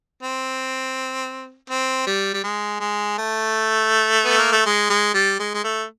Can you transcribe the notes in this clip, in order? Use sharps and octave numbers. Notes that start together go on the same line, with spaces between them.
C4
C4
G3
G3
G#3
G#3
A3
B3
A#3
A3
G#3
G#3
G3
G#3
G#3
A3